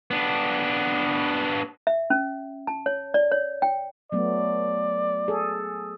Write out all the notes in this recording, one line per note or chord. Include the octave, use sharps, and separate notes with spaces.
B3 D4
E5
C#4
A5
C#5
D5
C#5
G5
F#3 A3 B3 D5
G#4 A4